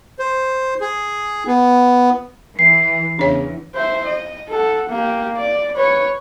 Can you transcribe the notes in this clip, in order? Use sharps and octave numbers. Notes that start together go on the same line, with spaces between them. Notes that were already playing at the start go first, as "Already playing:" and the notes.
C5
G#4
B3
E3 C7
E2 C#3 D4 C#5
C5 E5
D#5
A4 F#5
A#3 G4
D5
B4 C#5